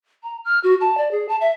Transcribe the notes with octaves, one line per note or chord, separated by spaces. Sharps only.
A#5
F6
F#4
A5
D5
G#4
A5
E5